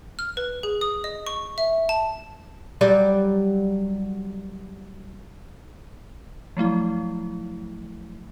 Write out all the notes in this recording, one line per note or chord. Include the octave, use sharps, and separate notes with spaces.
F6
B4
G#4
D#6
D#5
C#6
E5
A5
F#3 G3 D5
F3 F#3 A3 E4